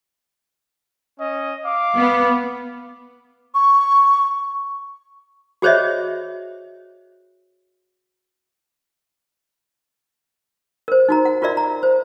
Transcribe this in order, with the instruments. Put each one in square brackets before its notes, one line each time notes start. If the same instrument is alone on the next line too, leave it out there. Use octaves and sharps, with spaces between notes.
[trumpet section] C#4 D#5
F5 D6
[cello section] B3
[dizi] C#6
[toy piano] F#4 G#4 C5 C#5 D#5 E5
A#4 C5
D#4 F#4 A#5
F#5
F4 F#4 A#4 D5 E5
A#5
C5